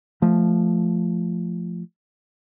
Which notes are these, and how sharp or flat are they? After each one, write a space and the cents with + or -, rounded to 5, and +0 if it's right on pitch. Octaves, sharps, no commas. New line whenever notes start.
F3 -5 A3 +0